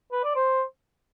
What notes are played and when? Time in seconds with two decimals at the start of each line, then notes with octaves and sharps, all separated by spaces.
0.12 B4
0.24 D5
0.36 C5